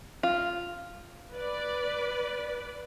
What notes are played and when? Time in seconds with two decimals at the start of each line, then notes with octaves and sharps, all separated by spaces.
0.23 F4
1.32 B4 D5